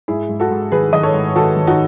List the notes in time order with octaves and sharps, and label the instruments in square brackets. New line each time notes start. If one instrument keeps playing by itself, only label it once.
[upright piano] G#2 E4 G#4
G#2
F#4 A4
G#2
D#3 G#4 B4
D#3 D#5
A4 C#5
G#2
D#3 F#4 A4
D#3
D#4 F#4